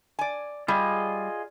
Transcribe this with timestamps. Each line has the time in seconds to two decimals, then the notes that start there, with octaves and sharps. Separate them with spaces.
0.19 D5 G#5
0.68 G3 F4 G#4 D#5